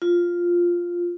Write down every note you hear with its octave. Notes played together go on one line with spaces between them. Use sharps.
F4